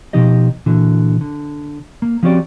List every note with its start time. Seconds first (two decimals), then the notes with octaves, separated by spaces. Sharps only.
0.13 B2 F3 D#4 G4 D#5
0.66 A#2 D3 E3 F#4
1.21 D3
2.02 A#3
2.23 F3 C4 C#4 F#4 G4 D5